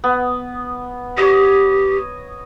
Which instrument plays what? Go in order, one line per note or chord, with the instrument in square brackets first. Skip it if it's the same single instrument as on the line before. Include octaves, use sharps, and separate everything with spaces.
[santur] B3
[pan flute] G4 [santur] C#5 D#5